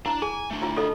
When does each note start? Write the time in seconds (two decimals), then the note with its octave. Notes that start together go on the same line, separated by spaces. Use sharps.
0.06 D4 E4 A#5
0.22 G#4 G#5
0.51 A3 D4
0.62 E4 F4
0.76 F4 A4 D#5